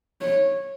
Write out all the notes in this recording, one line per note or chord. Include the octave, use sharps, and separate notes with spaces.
C#5